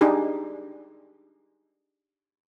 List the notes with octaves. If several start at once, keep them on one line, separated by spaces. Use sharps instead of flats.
D4 D#4 G4 G#4